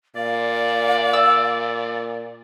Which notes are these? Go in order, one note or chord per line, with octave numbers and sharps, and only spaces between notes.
A#2 D5 F5
E6